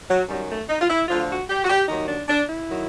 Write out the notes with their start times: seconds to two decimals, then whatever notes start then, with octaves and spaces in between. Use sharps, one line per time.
0.08 F#3
0.28 F#2 D#3 F#3 G3
0.48 A3
0.69 D#4
0.80 F4
0.89 E4
1.08 D2 D3 F3 F4
1.29 F#4
1.49 G4
1.64 F#4
1.69 G4
1.88 D#2 D#3 F#3 D#4
2.08 D4
2.28 D4
2.48 E4
2.69 D#3 F#3